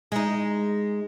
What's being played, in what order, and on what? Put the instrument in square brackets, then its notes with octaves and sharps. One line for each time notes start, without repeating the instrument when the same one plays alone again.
[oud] G#3 D#4